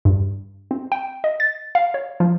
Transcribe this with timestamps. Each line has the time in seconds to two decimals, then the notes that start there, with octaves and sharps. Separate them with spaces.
0.05 G2
0.71 C4
0.92 G5
1.24 D#5
1.40 A6
1.75 F5
1.94 C#5
2.20 F3